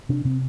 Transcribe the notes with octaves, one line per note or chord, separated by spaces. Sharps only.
C3 D4
C3 C4